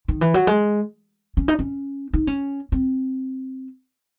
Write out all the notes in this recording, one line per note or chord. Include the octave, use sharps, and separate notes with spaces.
D#3
E3
F#3
G#3
C#4
D#4
C#4
D#4
C#4
C4